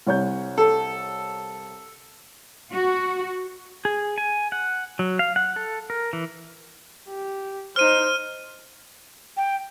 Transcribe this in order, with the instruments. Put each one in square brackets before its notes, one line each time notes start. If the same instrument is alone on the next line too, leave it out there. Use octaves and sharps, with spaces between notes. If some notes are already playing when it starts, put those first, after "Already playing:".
[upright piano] C2 C#5 G6
[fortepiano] A4
[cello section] F#4
[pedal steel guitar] G#4
G#5
F#5
F#3
F5
F#5
A4
A#4
E3
[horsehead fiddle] G4
[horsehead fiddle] D#4 C5 [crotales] F6 D#7
[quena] G5